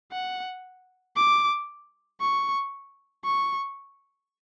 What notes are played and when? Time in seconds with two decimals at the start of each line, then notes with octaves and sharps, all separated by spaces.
0.12 F#5
1.16 D6
2.20 C#6
3.24 C#6